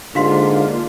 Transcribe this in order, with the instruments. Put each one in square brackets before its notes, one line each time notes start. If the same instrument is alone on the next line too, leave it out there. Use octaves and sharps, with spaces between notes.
[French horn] G#2 [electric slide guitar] D3 [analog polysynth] A#3 D4 F4 [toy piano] G4 F5 C6